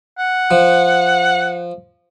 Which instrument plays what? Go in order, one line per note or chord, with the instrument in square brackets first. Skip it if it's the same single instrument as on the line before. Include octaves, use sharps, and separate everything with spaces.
[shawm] F#5
[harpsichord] F3